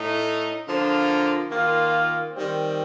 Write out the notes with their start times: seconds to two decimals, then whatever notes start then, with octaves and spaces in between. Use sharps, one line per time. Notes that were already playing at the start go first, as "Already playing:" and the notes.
Already playing: A2 A3 D#4
0.67 D3 F3 A#3 F4
1.49 D#3 A#3 F4
2.32 D#3 G3 C4